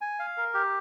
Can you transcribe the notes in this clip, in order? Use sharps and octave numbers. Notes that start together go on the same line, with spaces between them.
G#5
F5
A#4
G4